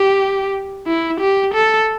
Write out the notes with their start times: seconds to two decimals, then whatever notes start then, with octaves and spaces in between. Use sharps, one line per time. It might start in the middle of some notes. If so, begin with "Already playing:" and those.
Already playing: G4
0.87 E4
1.21 G4
1.54 A4